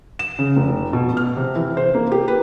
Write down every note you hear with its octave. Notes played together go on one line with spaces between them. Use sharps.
E7
C#3
F1
B2
F6
C3
E3
C5
A#3
G4
B4